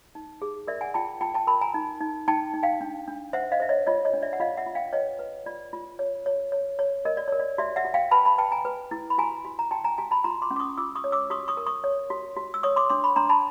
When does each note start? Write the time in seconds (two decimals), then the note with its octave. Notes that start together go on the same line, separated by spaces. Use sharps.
0.15 D#4
0.42 G#4
0.68 A#4 D5 E5
0.81 F#5 G#5
0.94 F4 G5 A5
1.21 F4 G5 A5
1.34 G5 A5
1.47 A#4 A5 B5
1.61 G#5 A#5
1.74 D#4
2.01 D#4
2.28 D#4 G5 A5
2.54 D#4
2.63 F5 G5
2.81 D4
3.08 D4
3.33 C5 E5 F#5
3.52 D#5 F5
3.60 C5 E5
3.69 C#5 D#5
3.87 F4 C#5 D#5
4.05 C#5 D#5
4.13 D4
4.22 D5 E5
4.33 F#5
4.40 F4 D#5 F5
4.57 E5 F#5
4.66 F4
4.75 F5 G5
4.93 B4 C#5 D#5
5.19 B4
5.46 F4 D5
5.73 F4
5.99 C#5
6.26 C#5
6.52 C#5
6.79 C#5
7.05 A#4 D#5
7.17 D5
7.28 A#4 C#5
7.40 D5
7.58 F#4 D5 E5
7.76 E5 F#5
7.85 F#4
7.94 F5 G5
8.11 B4 A5 B5
8.25 A5 B5
8.38 B4 G5 A5
8.51 G#5 A#5
8.65 B4
8.91 E4
9.10 B5
9.18 F#4 G#5 A#5
9.45 F#4
9.59 A#5
9.71 F#4 G5 A5
9.84 G#5 A#5
9.98 F#4 G#5 A#5
10.11 A5 B5
10.24 F4 A#5 C6
10.42 C6 D6
10.51 C#4
10.56 D6
10.59 C#6 D#6
10.78 F4 D6 E6
10.95 C#6 D#6
11.04 C#5
11.12 D6 E6
11.30 F#4 C#6 D#6
11.48 C#6 D#6
11.57 A#4
11.67 C#6 D#6
11.84 C#5
12.10 F#4
12.36 F#4
12.54 E6
12.63 C#5 C#6 D#6
12.76 C6 D6
12.89 D4 C6 D6
13.04 B5 C#6
13.16 D4 A#5 C6
13.29 A5 B5